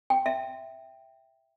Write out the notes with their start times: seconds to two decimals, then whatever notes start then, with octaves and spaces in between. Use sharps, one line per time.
0.10 G5
0.26 E5